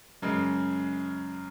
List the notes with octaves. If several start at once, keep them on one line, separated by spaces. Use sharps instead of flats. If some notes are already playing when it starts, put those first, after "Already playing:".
F#2 C#3 G#3